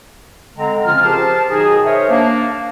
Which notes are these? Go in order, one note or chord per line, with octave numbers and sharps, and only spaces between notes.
D3 G#3 C4 A#5
C#3 F3 C4 C#4 F4 F6
G4 G#4 A#4 C5 A5
B2 D#3 F#3 D#4 G#4
A#4 C5 C#5 E5
A#3 D4 A5